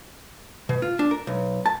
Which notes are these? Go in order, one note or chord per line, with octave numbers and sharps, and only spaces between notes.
B2
F4
D4
A#4
B1
A5